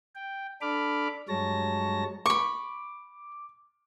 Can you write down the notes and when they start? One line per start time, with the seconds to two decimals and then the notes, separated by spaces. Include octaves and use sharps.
0.15 G5
0.61 D4 A4 B5 D6 F6
1.29 G2 F#3 G#3 C#5 A5 A#6
2.26 B5 C#6 D6